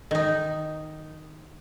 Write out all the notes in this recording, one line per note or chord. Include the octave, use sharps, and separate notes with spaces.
D#3 D#4